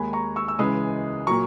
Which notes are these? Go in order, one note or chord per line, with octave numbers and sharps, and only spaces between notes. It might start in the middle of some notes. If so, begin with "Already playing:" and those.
Already playing: D#2 D#3 G#3 G#5 B5
A#5 C#6
C#6 E6
E6
C#2 C#3 E3 G#3 B5 D#6
A#2 F#3 A#5 C#6